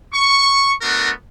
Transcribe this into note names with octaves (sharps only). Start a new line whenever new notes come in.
C#6
A3 B3 D4 F#4 A#4